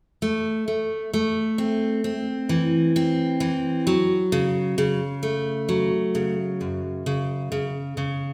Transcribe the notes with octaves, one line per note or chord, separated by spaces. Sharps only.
A3
A3
A3
C4
C4
E3
C4
E3
F#3
C#3
C#3
A3
F#3
C#3
F#2
C#3
C#3
C#3